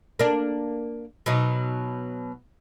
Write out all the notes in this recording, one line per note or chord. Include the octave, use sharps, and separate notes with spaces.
A#3 D4
B2 F#3 D#4